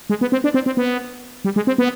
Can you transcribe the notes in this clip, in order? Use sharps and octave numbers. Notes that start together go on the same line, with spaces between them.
G#3
B3
C4
D4
C4
C4
B3
G3
G#3
C4
B3